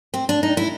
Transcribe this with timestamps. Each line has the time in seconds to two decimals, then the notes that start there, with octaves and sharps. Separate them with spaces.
0.14 C4
0.29 D4
0.43 D#4
0.57 E4